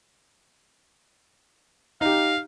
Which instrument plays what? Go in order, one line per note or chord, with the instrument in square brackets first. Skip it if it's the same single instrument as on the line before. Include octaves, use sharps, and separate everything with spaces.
[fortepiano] D#4 G4 [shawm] F5